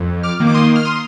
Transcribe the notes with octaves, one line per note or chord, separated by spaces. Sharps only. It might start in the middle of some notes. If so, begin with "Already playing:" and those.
Already playing: F2
D6 F6
D#3 A#3
D6
C6 D#6
F6
C6 D#6